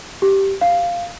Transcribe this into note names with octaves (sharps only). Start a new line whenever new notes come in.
G4
F5